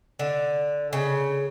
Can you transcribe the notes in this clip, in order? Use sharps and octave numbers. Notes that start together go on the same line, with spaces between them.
D3
C#3